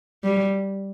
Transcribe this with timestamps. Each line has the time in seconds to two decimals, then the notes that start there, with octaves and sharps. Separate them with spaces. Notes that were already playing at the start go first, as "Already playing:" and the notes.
0.24 G3